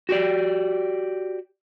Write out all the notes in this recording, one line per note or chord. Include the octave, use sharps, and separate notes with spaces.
F#4 G4 D5